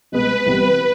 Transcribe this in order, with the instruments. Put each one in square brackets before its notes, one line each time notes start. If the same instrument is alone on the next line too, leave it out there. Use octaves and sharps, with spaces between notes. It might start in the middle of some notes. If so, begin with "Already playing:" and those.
[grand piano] C2 B2 G#3 B3 [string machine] B4
[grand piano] C2 C3 E3 G3 B3